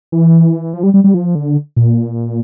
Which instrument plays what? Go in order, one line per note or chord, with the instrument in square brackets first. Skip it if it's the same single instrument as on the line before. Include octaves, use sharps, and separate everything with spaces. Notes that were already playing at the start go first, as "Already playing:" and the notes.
[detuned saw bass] E3
F3
G3
G3
G3
F3
D3
A#2